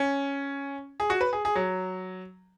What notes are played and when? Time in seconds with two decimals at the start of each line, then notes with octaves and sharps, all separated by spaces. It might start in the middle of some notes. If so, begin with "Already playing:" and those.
Already playing: C#4
1.00 G#4
1.10 F#4
1.21 B4
1.33 G#4
1.45 G#4
1.55 F#3